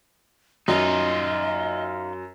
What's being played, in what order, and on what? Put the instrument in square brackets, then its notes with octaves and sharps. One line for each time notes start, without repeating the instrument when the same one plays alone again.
[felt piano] F#2 [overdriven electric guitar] D#4 F4 [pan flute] D#5